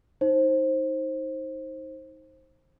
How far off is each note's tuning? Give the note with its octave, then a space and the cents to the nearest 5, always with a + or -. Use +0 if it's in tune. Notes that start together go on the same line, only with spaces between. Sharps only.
D#4 +15 C5 +20